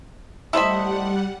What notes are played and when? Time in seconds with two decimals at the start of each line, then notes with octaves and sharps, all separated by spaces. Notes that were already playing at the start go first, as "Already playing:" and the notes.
0.53 G3 A3 E4 C5 D#5 E5 F#5